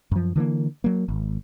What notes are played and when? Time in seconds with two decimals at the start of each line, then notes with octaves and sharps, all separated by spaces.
0.11 F#2 F3
0.36 D3 E3 A3 A#3
0.84 F#3 A#3
1.08 G#1